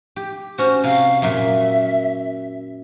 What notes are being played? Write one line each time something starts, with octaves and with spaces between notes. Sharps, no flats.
G4
C#4 F#4 C5
C3 F5
F#2 A#2 E5